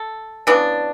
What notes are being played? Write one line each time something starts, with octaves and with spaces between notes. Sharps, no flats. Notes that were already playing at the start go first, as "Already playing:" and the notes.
Already playing: A4
C#3 E3 B3 D4